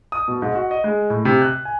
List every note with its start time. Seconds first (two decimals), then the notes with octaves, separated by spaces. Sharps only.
0.12 D#6
0.28 B2
0.42 G#2
0.55 F#4
0.71 D#5
0.84 G#3
1.10 A2
1.25 C3
1.42 F#6
1.65 G#5